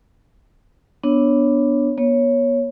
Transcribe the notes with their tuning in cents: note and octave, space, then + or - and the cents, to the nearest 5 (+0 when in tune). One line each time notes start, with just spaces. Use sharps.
B3 +0 D4 +0 C#5 +0
B3 -35 C#5 +0